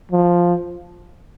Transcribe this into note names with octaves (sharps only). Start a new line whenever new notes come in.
F3